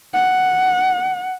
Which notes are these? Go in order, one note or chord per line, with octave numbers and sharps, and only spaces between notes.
F#5